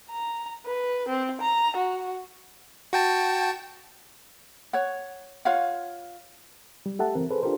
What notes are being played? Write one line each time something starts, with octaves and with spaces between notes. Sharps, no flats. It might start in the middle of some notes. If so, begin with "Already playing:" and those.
A#5
B4
C4
A#5
F#4
F#4 G5 A5
C#5 F#5
F4 C#5 F5 F#5
G3
A3 G4 A4 E5 F#5 A5
E3 C4 A#4
G#4 A4 B4 C5
D4 F4 G4 A4 A#4 C5